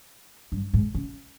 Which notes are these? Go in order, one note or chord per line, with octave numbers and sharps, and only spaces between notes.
G2
G#2
C#3